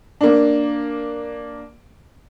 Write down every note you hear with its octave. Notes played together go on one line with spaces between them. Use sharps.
A#3 D4